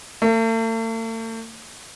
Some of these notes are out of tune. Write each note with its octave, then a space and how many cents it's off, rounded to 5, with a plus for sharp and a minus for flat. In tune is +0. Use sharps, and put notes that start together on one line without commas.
A3 +45